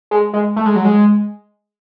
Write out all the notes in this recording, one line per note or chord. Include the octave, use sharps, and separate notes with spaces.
G#3
G#3
A3
G#3
F#3
G#3